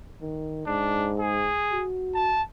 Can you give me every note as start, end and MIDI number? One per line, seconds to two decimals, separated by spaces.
0.21 0.64 51
0.67 1.51 44
0.67 1.12 62
1.20 1.84 68
1.72 2.39 66
2.14 2.42 81